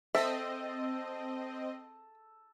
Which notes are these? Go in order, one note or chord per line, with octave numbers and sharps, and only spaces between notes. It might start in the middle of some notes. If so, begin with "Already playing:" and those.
C4 A4 D#5 E5